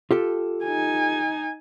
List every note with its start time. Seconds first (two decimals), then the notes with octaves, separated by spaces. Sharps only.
0.11 F4 G4 A4
0.64 D#4 G#5